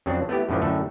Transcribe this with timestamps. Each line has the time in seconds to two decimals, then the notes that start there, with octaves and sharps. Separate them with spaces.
0.06 F2 C#3 F#3 C4 D4
0.29 A3 B3 E4 G4
0.49 F#2 A2 D3 E3 F3
0.61 F#2 A2 D3 A3 A4 E5